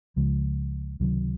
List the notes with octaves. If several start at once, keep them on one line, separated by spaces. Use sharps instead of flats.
C#2 C#3 F3 G#3
C#2 C3 D#3 F#3